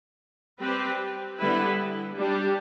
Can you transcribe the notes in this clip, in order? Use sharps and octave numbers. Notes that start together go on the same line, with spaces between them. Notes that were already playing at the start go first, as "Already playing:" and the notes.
G3 C4 G4 B4
D3 G3 B3 E4 B4
G3 D4 G4